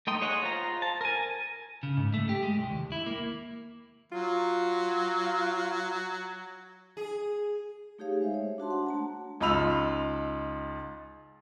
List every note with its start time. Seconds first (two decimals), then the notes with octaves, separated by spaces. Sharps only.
0.07 A3 D#4 G5 C6 D#6
0.21 G#4 C#5 D#5 F#5
0.43 F4 C5 A#5
0.82 A5
1.01 A#4 G#5
1.83 C#3
1.97 G#2
2.14 A3
2.29 G4
2.43 G#3
2.58 C2
2.70 D#2
2.92 E4
3.06 A#3
4.12 F#3 F4
6.97 G#4
7.99 A3 D#4 G4 G#4 C#5 F5
8.21 G#3 C5 E5
8.34 C#5
8.58 D4 F#4 A5 C6
8.71 F#5 A5
8.87 A3 A5 A#5
9.41 C#2 D#4 F4 B5 E6 F7